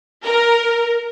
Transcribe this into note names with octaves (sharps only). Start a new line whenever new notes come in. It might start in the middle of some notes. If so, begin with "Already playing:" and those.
A#4